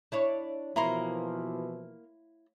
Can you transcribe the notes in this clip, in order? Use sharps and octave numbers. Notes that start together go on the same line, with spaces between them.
D4 E4 C#5
B2 E3 F3 A#3 E4 A#5 C6